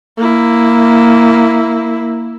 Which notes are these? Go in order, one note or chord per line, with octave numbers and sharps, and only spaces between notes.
A#3 E4